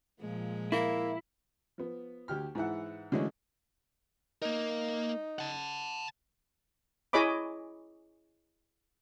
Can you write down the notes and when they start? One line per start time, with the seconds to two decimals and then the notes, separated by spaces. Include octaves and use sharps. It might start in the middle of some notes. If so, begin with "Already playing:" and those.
0.20 A#2 F3 G#3
0.72 A#3 E4
1.78 F3 B3
2.28 D2 G4 F6
2.55 G#2 E3 E4 F#5
3.12 D3 E3 F#3 G#3 A3 C#4
4.42 A#3 D#4 A#4
5.39 F#5 A5
7.13 E4 G#4 C#5 D#5 B5 D6